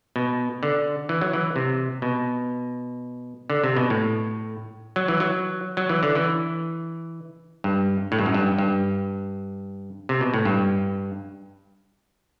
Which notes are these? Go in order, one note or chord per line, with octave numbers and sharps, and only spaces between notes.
B2
D3
E3
F#3
E3
C3
B2
D3
C3
B2
A2
F#3
E3
F#3
F#3
E3
D3
E3
G2
A2
G2
F#2
G2
G2
C3
B2
A2
G2